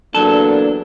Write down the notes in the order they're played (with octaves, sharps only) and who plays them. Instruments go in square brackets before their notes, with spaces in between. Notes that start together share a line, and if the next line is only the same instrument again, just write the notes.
[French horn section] E2 A#3 D4 [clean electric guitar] F#3 A4